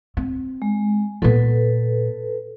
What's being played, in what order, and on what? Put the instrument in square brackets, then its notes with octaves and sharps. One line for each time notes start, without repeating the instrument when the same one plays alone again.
[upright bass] C4
[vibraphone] G#3
[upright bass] A#2 B3 [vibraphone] A4 B4